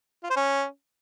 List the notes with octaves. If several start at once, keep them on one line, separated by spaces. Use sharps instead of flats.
F4
C5
C#4